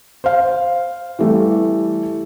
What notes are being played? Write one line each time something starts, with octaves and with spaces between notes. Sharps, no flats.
C5 F5
E3 G3 A3